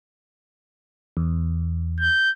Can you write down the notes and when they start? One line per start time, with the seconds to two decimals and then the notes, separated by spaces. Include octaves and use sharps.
1.17 E2
2.00 G6